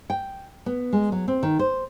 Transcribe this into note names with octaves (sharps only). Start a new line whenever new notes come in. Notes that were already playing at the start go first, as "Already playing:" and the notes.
G5
B3
G#3
F#3
C4
D#3
C5